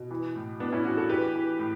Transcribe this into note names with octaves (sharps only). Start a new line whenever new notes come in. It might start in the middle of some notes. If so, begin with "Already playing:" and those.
Already playing: B2
E3
A2
A2 B3 D4
C#4 E4
E3 D4 F#4
F#4 A4
E3 G4 B4
E3
A2